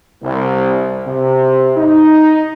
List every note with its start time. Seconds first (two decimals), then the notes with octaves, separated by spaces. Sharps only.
0.22 C2
1.06 C3
1.77 D#4